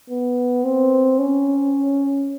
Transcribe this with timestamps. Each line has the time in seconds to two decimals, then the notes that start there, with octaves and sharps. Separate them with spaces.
0.10 B3
0.64 C4
1.19 C#4